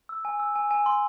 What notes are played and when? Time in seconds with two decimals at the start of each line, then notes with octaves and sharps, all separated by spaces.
0.09 E6
0.25 G#5
0.40 E6
0.55 G#5
0.71 G#5
0.86 C6